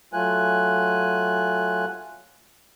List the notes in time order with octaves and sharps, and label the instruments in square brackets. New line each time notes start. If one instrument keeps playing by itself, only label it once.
[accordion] F#3 A3 F4 G#5 F#6